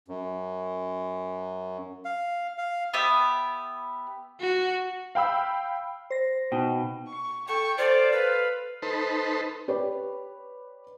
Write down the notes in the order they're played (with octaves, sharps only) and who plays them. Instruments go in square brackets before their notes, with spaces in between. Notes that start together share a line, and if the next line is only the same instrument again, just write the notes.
[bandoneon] F#2
F5
F5
[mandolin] B3 G4 E5
[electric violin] F#4
[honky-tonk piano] F5 G5 B5 E6
[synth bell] C5 A#6
[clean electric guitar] B2 [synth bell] D#4 G5
[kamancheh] C#6
[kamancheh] A4 G5 [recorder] C#6
[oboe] F4 [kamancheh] A4 [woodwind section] C5 [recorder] D5
[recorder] B4 [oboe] F5
[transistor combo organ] D#4 A4 B4 C5
[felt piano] G4 B4 C#5 D5